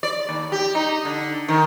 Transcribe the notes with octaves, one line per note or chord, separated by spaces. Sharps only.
D5
D#2
G4
D#4
D3
D#3